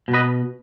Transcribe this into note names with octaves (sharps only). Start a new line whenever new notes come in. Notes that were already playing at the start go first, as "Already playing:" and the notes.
B2
B4 D#5